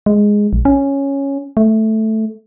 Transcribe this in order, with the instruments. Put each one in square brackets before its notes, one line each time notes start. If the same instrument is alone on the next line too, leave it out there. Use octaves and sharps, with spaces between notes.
[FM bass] G#3
A#1
C#4
A3